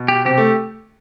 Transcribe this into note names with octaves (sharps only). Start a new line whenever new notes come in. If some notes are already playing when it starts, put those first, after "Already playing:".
Already playing: B2
G4
C3 G4
A3